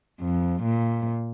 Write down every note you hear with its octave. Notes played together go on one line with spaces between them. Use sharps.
F2
A#2